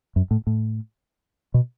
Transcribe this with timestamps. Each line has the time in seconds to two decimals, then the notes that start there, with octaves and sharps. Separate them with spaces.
0.16 F#2
0.31 A2
0.47 A2
1.54 B2